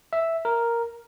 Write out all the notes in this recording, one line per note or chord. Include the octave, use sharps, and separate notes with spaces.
E5
A#4